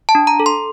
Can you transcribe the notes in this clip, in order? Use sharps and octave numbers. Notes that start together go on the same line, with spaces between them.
A5
D4
A#5
A4
C6